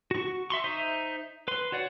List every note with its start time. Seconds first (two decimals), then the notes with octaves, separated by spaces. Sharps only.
0.11 F#4 C#6
0.50 E5 C6 C#6
0.64 D#4 C5 E5
1.48 B4 C6
1.72 F#4 C#5 D5 F#5